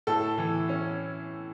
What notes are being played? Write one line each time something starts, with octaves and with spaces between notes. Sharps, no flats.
A2 A4
E3
C#4